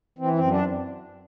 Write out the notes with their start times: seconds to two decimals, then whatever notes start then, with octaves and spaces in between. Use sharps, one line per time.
0.18 E3 C4
0.33 C4
0.39 F#2
0.48 D4